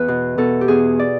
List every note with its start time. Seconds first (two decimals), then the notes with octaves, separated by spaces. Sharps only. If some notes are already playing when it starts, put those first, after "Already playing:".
Already playing: E2 B4
0.08 B2
0.38 B2 A4
0.61 G4
0.68 E2 G#4
0.99 D5